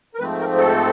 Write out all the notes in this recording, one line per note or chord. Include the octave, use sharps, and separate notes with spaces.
A#4
G#2 F3 A3 C4 B4
A#4
A4